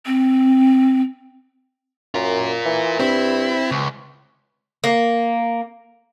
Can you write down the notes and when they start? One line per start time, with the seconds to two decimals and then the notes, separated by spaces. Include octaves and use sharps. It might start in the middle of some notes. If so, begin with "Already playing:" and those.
0.06 C4
2.15 F#2 F4 A#4
2.65 E3
2.99 G2 C4 E4
3.71 C#2
4.84 A#3